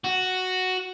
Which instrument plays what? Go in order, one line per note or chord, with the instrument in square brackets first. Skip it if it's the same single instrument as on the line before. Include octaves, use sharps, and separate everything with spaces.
[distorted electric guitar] F#4